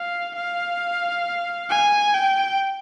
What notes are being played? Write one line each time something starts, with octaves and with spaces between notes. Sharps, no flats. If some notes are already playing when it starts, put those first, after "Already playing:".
Already playing: F5
F5
G#5
G5